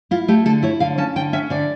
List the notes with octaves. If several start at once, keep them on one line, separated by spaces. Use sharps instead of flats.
E4 F4
A3 G4
D3 A4
E4 C#5
D3 F5
C#4 A5
D3 G5
C#4 E5
D3 D5